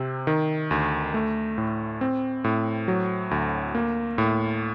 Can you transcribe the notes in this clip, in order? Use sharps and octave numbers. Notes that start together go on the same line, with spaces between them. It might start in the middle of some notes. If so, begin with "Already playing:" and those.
Already playing: C3 C4
D#3
D2
A3
A2
C4
A2
F#3
D2
A#3
A2